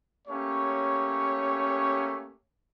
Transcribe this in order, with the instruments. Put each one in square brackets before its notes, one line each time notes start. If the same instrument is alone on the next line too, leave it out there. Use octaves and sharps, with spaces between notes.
[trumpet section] A3 A#3 C#4 G4 C#5